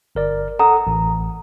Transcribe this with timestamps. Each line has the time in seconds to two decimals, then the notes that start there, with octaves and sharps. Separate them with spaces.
0.15 G1 A#4 D5
0.59 A4 F#5 A#5 D#6
0.87 A1